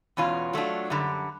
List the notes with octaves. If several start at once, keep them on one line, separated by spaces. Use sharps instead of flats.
E2 B2 G#3 C#4 F4
F#3 A3 D4 F4
F#2 D3 G3